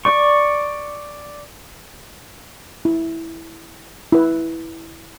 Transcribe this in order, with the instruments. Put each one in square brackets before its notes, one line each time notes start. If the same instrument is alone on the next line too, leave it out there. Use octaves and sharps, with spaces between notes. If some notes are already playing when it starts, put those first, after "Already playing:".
[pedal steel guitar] D5 C#6
[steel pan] E4
E4 B4